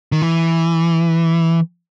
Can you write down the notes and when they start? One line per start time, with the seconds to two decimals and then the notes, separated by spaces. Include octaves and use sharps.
0.12 D#3
0.22 E3